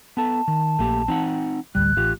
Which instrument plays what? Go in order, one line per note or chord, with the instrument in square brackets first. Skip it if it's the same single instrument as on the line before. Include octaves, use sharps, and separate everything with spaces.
[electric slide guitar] B3 A4 [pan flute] A5
[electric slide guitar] D#3
[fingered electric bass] A#1 [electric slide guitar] A3 A#3 G4
[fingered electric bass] E3 [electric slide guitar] C4 D#4 F#5
[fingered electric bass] A1 D2 A2 [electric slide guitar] G3 [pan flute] F#6
[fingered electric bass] A1 [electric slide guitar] F4 G4